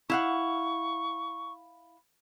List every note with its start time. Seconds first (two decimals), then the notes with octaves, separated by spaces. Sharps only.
0.10 E4 F5 F#5 C#6